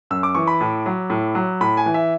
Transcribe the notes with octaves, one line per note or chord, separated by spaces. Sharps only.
F#2 E6
D6
E3 C#6
B5
A2
F#3
A2
F#3
A2 B5
G#5
E3
E5